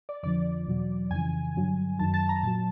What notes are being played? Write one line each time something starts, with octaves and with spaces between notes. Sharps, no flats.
D5
F2 D3 F3 D5
E2 B2 F#3
F2 C#3 E3 G#5
G2 D3 F#3
F#2 D#3 F#3 A5
A5
A#5
A#2 F#3 A5